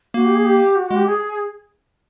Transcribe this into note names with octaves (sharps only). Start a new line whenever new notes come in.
A#3 F#4
G4
G#4
G4
F#4
G#3 F#4
G4
G#4